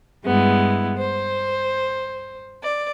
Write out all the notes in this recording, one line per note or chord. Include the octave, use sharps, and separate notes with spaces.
G2 G#3 B3 E4
C5
D5